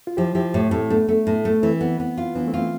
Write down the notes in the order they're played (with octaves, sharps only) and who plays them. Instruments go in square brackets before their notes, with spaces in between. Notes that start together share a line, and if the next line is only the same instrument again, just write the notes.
[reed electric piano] F4
[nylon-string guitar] F3 [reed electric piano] E4 G4
[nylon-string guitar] F3 [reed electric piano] E4 G4
[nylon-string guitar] A2
[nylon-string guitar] A2 [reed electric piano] A3 C4
[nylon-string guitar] A3 [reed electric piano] B3 D4
[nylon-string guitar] A3
A2
A3
[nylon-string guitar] E3 [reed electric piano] C4 E4
[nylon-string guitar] B3
B3
F4
[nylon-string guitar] E3 [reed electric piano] B3 D4
[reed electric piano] A3 C4
[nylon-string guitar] F4